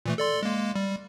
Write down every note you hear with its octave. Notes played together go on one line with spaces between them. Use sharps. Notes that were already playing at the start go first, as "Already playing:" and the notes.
A#2 E3 A3
A4 D5 C6
G#3 A#3
G3